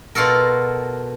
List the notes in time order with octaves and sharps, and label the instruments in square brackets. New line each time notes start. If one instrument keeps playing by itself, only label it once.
[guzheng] B2 F4 F#4 A4 A#4